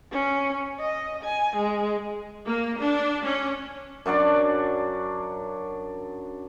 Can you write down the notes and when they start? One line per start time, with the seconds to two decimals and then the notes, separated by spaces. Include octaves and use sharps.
0.11 C#4
0.80 D#5
1.24 G#5
1.56 G#3
2.45 A#3
2.80 D4
3.24 C#4
4.06 F#2 F#3 D4 D5